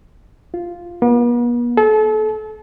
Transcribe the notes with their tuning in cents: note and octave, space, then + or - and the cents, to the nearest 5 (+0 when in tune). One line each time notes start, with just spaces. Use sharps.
F4 -5
B3 -45
A4 -35